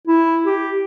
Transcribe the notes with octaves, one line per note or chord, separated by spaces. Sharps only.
E4
G4